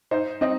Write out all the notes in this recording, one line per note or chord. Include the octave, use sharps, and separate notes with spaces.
D#4 C5
C4 D#5